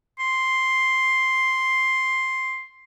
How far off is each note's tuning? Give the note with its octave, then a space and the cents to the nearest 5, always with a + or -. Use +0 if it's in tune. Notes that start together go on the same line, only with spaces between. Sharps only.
C6 +5